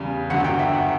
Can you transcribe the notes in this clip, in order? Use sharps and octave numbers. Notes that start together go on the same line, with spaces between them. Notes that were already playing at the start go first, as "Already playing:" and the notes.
Already playing: E2 C#3 G3
G1 F#2 D3 F#3 F#5
G5
E5
F#5